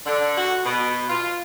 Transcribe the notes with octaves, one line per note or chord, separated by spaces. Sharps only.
D3
F#4
B2
F4